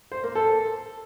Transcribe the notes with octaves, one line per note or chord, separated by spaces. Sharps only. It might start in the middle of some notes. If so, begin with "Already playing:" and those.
C5
A#3
A4